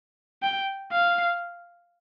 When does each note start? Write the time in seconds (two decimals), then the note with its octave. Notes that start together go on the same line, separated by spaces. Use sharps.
0.43 G5
0.92 F5